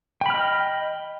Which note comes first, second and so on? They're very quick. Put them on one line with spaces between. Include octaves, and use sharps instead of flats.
G5 B5 F6 D#5